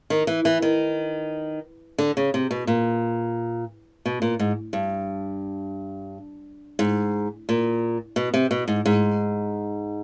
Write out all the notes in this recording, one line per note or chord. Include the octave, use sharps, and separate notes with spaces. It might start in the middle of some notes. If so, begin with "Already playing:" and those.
D#3
E3
E3
D#3
D3
C#3
C3
B2
A#2
B2
A#2
G#2
G2
G#2
A#2
B2
C3
B2
G#2
G#2